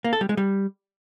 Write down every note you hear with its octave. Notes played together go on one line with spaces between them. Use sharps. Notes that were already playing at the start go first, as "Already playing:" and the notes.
A#3
A4
G3
G#3
G3